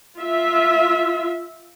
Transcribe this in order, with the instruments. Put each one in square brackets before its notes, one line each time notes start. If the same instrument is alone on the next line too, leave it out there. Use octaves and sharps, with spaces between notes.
[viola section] F4 E5